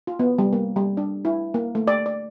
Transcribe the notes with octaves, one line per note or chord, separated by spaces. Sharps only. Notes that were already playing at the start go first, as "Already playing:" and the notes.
F4
B3
G3
A#3
G3
D4
E4
A#3
A3
D5
D5